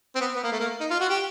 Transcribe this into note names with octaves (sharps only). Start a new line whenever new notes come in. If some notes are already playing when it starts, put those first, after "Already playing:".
C4
B3
B3
A#3
A3
A#3
D#4
F4
F#4
G4